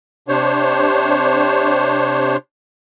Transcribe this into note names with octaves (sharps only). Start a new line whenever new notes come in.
C3 D4 C5 C#5